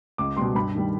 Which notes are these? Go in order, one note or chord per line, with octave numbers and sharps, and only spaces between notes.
C#2 D6
B2 G3 C6
G2 B5
D#3 G3